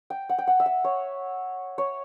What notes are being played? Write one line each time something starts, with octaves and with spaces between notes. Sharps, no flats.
G5
F#5
G5
F#5
E5
F#5
C#5
C#5